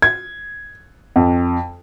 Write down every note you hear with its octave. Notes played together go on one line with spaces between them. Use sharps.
G#6
F2